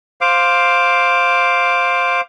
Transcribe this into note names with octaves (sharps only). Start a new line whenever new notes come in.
C5 F5 D6